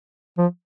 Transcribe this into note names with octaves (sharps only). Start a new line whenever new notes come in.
F3